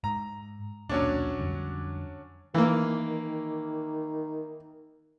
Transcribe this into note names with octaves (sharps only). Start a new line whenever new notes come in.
G#2 A#5
D#1 B1 F#3 A#3 C#4 D4
F2 D3 G3
D#3 E3 A#3